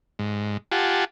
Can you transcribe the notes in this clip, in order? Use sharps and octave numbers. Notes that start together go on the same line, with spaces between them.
G#2
F4 G4 F#5 G#5 A5